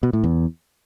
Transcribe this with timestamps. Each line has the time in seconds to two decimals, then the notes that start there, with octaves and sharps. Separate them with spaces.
0.03 B2
0.13 A2
0.24 E2